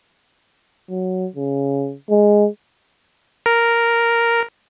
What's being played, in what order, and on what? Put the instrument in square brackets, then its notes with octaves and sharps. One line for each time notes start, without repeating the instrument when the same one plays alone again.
[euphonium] F#3
C#3
G#3
[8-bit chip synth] A#4